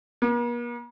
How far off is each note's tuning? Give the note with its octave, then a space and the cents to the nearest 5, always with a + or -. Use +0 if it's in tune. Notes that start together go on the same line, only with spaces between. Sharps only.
A#3 +45